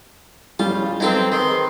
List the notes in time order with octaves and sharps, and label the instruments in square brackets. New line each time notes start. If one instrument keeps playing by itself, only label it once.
[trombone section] D#2 C#3 [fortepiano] G3 [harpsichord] F4
[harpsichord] F#3 G4 B4 [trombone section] C4 [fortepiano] D#4 A4
[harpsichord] D#3 [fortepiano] G#4 [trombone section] B4 [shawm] C6